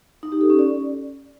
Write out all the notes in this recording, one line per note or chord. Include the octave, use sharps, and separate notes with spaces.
D#4
G4
A4
C#4
D5